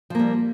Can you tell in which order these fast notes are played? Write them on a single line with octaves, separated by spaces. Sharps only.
F3 A#3 G3